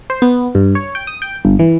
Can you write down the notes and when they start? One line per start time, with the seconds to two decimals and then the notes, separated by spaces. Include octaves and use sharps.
0.10 C5
0.22 B3
0.55 G2
0.75 C#5
0.95 G5
1.07 D#6
1.22 G5
1.45 G1
1.59 E3